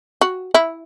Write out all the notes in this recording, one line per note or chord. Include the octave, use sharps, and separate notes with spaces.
F#4
E4